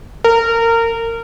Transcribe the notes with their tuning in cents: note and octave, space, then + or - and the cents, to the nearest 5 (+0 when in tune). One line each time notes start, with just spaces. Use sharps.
A#4 -25